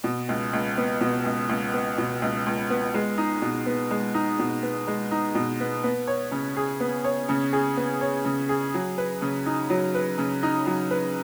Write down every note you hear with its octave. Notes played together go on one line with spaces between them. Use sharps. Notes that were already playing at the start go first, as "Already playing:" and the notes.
B2
C#2
C#2
B3
B2
C#2
C#2
B3
B2
C#2
C#2
B3
G#3
D#4
B2
B3
G#3
D#4
B2
B3
G#3
D#4
B2
B3
B3
C#5
C#3
G#4
B3
C#5
C#3
G#4
B3
C#5
C#3
G#4
F#3
B4
C#3
D#4
F#3
B4
C#3
D#4
F#3
B4